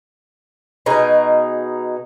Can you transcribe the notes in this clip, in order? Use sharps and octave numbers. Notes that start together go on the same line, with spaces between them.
B2 D#4 G#4